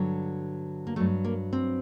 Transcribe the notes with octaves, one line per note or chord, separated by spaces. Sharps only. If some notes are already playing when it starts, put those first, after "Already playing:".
Already playing: G2 D3 F#3
A#3
G2 F#3 A3
A#3
C4